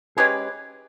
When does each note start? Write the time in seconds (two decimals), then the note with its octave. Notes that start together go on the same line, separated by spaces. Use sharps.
0.17 G#3 C#4 G4 G#4 B4